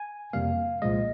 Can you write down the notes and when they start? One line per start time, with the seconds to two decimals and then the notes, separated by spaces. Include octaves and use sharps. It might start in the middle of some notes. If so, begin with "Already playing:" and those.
Already playing: G#5
0.33 F2 C3 G3 A#3 F5
0.82 C2 A#2 F3 G#3 D#5